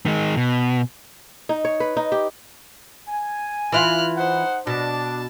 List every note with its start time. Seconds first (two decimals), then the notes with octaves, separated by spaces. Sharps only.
0.06 D#3 G#3
0.37 B2
1.49 D#4
1.65 C#5
1.80 B4
1.97 D#4
2.12 G4
3.09 G#5
3.72 E3 E4 F4 F6 F#6
4.17 D#4 C5 F#5
4.67 B2 D4 A5